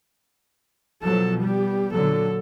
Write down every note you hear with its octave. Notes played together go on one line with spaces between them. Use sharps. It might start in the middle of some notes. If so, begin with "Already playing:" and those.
B2 F3 F#3 A4 A5
G3 B3 G4
A#2 D3 F#3 A4